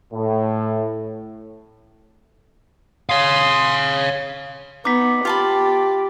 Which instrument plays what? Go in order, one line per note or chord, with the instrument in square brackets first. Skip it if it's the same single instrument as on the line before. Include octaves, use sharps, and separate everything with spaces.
[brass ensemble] A2
[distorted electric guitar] C#5 F5 [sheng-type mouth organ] C6 D#6
[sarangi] B3 [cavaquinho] D#4 [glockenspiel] D6 B6
[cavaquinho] F4 A5 B5 [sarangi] G4